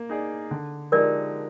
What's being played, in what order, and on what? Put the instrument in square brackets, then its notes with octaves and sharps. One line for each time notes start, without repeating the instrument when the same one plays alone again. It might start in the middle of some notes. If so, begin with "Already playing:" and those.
Already playing: [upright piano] A#3
D#4 G#4 D5
D3
[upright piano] F3 G#3 D#4 G4 [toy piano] A#4 D5